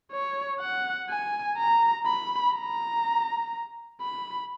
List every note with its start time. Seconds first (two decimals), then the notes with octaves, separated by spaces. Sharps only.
0.11 C#5
0.60 F#5
1.10 G#5
1.57 A#5
2.06 B5
2.54 A#5
4.01 B5